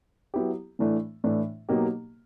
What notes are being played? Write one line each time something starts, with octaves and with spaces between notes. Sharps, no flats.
F#3 B3 E4 G4
A2 E3 A3 D4
A2 E3 A3 D4
B2 F#3 A#3 D#4 G4